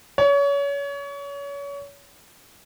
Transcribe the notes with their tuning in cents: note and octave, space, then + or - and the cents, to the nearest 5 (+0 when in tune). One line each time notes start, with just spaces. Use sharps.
C#5 +30